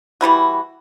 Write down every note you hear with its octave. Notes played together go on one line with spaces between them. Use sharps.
E3 G3 E4 F#4